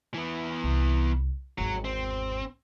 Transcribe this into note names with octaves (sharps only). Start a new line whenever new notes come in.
E3 B3
C2
G#1 E2 F#3
C4